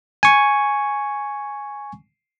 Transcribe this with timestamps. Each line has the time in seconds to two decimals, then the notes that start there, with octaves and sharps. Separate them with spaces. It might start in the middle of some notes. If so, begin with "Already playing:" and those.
0.23 G#5 C#6